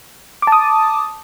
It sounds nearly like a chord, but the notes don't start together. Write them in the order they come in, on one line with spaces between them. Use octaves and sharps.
D6 A5 D#6